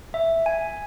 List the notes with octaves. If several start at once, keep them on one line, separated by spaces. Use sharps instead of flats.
E5
G#5